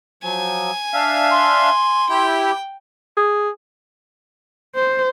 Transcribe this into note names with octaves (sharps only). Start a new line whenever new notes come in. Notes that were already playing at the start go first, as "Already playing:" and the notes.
F3 F#3 G#5
D4 E5 F5
C6
E4 G4 G5
G#4
C5